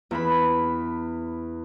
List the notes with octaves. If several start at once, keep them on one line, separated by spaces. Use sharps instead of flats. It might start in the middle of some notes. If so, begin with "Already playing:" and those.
E2 E5 B5